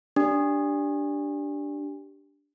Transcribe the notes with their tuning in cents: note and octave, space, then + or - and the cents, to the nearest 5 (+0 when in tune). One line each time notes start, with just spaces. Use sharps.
D4 -10 G4 -5